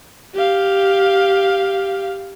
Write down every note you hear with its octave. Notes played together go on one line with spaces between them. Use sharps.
G4 F5